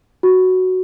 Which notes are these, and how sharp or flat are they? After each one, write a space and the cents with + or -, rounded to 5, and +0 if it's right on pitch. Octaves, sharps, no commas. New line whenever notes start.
F#4 +5